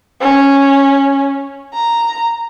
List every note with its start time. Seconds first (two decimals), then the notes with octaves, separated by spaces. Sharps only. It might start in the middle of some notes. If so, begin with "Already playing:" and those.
0.21 C#4
1.74 A#5